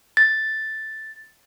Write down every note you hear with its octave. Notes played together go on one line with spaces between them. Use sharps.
A6